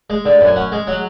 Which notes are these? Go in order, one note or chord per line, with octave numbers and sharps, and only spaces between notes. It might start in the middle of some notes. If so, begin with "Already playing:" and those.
G#3
D3
F#2
G#5
C#4 F#5
G#3
F#3 F#5